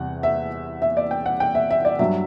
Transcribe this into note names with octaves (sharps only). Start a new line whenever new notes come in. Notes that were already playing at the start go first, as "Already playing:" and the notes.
Already playing: E2 C3 E3 G3 F#5
E5
E5
D5
G5
F#5
G5
E5
E5
D5
G2 F#3 E5